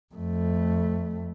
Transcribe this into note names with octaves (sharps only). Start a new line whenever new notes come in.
F2 A3